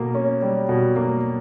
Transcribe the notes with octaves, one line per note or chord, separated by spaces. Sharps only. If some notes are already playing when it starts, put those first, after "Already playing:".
Already playing: B2 A#3
C#4
G3
B2
A#3